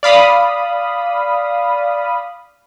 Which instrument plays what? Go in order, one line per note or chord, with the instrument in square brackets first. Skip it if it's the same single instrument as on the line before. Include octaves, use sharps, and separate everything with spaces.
[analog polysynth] D5 F5 B5 D#6